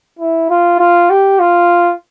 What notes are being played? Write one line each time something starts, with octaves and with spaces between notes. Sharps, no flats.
E4
F4
F4
G4
F4